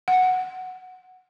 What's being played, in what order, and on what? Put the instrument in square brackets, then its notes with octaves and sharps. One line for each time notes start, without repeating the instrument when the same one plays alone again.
[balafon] F#5